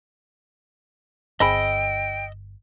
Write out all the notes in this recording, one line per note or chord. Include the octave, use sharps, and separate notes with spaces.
G1 C4 G#4 D#5 G5 B5 E6